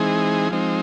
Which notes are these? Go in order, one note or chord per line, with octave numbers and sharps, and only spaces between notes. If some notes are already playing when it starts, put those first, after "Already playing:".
Already playing: E3 G#3 C4 D#4 G#4
F3 G#3 C4 D#4